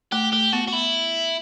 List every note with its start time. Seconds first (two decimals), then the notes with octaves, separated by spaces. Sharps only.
0.12 A3 G4
0.33 A3 G4
0.53 B3 F#4
0.68 F#4
0.73 E4